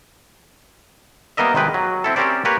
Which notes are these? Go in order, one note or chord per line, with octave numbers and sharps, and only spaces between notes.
G3 A#3 B3 A#4 D#5 E5
G#1 C3 D#3 G#3 B4 G5
F#3
C4 E4 A4
C4 C#4 G4 A#4 C5 D5
A#3 G4 A#4 B4 C#5